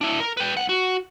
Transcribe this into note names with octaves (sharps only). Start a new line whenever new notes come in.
D4 E4
A#4
B4 G5
B1 F#5
F#4